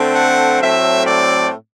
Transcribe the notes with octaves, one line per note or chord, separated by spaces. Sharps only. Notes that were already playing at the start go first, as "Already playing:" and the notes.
Already playing: D3 A3 C4
F#5
A2 F#3 A3 C4 E5
D5